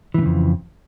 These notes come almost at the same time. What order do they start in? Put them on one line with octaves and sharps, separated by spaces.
E3 A2 C#3 F2